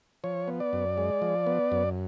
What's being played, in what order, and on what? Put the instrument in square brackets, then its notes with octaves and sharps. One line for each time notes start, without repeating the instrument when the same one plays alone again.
[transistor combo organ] F3 C#5
B3
D5
F#2
G#3
F3
B3
F#2